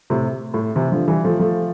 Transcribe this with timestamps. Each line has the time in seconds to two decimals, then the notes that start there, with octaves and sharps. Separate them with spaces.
0.10 A2 C3
0.54 A2
0.75 C3 E3
0.92 D3 F3
1.08 E3 G3
1.24 F3 A3
1.39 F3 A3